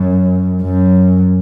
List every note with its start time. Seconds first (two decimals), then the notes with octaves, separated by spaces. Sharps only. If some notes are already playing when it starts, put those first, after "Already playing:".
Already playing: F#2
0.63 F#2